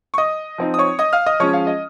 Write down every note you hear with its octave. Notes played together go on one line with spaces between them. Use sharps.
C#6
D#5 D#6
F3 C4 D#4
D#6
C#5 C#6
D#5 D#6
F5 F6
D#5 D#6
F3 G#3 C#4 C#5 C#6
F5
D#5